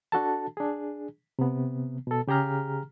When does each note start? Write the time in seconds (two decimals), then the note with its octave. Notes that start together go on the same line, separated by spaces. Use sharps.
0.12 D4 F#4 A4 A5
0.57 D4 G#4
1.39 C3 B3
2.07 B2 A4
2.28 C#3 G4 G#4 A#5 F6